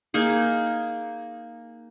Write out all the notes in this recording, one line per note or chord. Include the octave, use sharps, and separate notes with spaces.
A#3 D#4 G#4